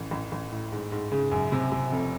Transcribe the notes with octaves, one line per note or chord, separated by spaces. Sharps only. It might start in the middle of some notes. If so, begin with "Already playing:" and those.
Already playing: A1
A1
A1
A2
G#2
G#2
C#3
F#2
C3
C3
F1